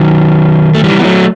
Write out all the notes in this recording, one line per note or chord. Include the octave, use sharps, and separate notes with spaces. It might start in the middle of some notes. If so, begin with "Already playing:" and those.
Already playing: D#3 F#3
A3
E3 G3
B3
F#3 A3